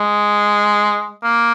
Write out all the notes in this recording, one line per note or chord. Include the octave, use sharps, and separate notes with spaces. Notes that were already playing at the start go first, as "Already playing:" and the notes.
Already playing: G#3
A#3